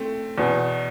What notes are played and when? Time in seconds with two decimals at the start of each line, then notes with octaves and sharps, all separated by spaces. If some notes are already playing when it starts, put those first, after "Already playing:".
Already playing: A3 C4
0.38 E2 B2